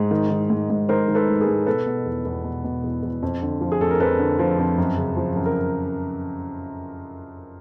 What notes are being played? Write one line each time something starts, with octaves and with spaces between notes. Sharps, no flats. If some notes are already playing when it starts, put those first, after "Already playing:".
Already playing: G#2
D#3
D#3
G#2
G#2
D#3 A#4 C5
D#3
A4 B4
G#2
G#4 A#4
G#2
B2 A4 B4
B2
E2
E2
B2
B2
E2
E2
F2
D3
F3
G#4
F2 A4
A#4
F2 A4 B4
D3
F3
F2
F#2
C#3
F3
F#2
A#4